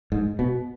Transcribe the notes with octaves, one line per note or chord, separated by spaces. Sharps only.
G#2
B2